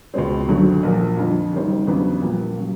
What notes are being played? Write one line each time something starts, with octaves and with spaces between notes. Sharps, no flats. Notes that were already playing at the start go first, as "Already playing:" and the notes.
C#2 B2 G#3 C4
G#1 F#2 D3 F#3 A3
A#1 A#2 F3
F2 D3 F3
F#1 F#2 D#3 G3 C4
E2 C#3 F#3 B3 D4
A#1 A#2 G3 A#3
C#3 F#3